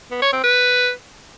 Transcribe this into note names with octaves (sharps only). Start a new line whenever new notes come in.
B3
C#5
C4
B4